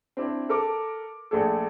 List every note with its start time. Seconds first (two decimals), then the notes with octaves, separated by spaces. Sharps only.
0.17 C4 D4 E4
0.49 A4 A#4 D6
1.31 A#1 A3 G#4 A4